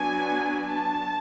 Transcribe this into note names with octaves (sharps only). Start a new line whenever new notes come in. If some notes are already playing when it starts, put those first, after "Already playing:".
Already playing: F#3 B3 D4 G#5
A5